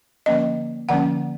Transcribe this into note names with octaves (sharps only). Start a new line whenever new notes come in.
D3 F3 A#3 C#4 D#5
D3 F3 A#3 C#4 F#5